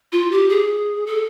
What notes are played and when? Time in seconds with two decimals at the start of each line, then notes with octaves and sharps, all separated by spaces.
0.12 F4
0.31 G4
0.49 G#4
1.06 A4